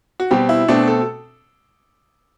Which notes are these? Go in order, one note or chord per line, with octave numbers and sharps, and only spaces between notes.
F#4
B2 G3 C4 G4
E4
B2 A3 C4 D4
A4